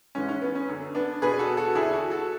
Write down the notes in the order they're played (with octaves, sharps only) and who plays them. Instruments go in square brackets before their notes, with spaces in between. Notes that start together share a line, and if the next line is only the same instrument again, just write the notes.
[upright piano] G#2 E3 C#4
C#4
B3
C#4
F#2 D3
B3 D4
E2 B2 G#4 B4
F#4 A4
F#4 A4
E2 D3 E4 G#4
F#4 A4
F#4 A4